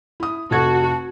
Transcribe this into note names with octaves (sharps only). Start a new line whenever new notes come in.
E4 D#6
F1 F#4 A4 A5 G#6